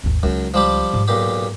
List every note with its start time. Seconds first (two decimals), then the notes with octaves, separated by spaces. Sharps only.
0.04 G#1 D#2
0.23 C#2 F#2 D#4
0.54 F3 G3 G4
0.94 G#2
1.08 B1 A#2 G4